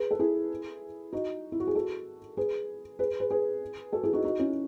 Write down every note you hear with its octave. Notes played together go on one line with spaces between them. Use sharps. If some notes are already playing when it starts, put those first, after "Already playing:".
Already playing: G#4 B4
A4
E4 G#4
D#4 F#4
E4
F#4
G#4
F#4 A4
G#4 B4
G#4 B4
G#4 B4
G#4 B4
F#4 A4
E4 G#4
D#4 F#4
D#4 F#4
C#4 E4